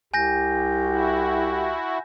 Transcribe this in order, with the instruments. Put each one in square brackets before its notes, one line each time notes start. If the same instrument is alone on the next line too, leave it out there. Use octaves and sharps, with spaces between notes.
[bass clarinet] C2 [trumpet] G4 [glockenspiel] G#5 G6 A#6
[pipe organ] E4 F#4